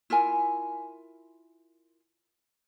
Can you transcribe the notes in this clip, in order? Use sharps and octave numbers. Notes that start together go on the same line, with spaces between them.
E4 F4 A#4 G#5